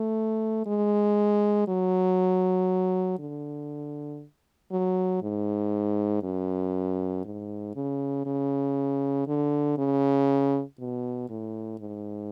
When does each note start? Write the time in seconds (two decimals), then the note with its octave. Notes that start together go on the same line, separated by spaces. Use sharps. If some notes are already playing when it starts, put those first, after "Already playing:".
Already playing: A3
0.67 G#3
1.68 F#3
3.19 D3
4.72 F#3
5.22 G#2
6.23 F#2
7.25 G#2
7.75 C#3
8.26 C#3
9.27 D3
9.78 C#3
10.80 B2
11.30 A2
11.80 G#2